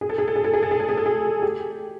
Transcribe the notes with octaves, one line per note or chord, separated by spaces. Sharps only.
G#4
A4
G#4
A4
G#4
A4
G#4
A4
G#4
A4
G#4
A4
G#4
G4